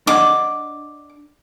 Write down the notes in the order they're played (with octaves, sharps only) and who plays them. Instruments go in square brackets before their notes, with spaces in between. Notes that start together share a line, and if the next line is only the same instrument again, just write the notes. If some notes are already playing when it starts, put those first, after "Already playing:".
[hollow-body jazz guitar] D4 D#5 F#5 [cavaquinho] D6